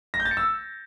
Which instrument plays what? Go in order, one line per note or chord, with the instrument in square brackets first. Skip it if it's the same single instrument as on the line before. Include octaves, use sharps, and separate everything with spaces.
[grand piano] A#6
G6
A6
C#7
E6